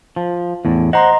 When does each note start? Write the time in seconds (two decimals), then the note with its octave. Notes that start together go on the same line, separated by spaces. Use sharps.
0.16 F3
0.65 E2 A2
0.93 C5 D#5 F#5 A#5 C6